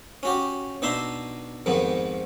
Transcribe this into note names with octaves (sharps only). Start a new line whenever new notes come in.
C#4 F#4 G4
B2 D4 D#4 E5 C6
F2 G#2 D#3 B3